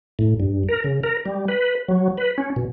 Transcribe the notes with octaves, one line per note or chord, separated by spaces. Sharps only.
A2
G2
A#4
C#3
A#4
G3
B4
F#3
B4
C#4
B2